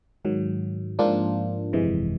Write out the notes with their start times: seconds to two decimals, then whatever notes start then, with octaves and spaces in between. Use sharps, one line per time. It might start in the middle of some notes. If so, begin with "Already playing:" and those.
0.25 G#2 D#3 F#3
0.99 G#2 F3 A#3 D4 F4
1.73 G1 F2 C3 E3 G#3